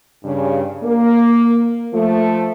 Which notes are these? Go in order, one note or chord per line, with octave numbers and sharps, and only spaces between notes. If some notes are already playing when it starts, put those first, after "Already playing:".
G2 C#3
A#3
F3 A3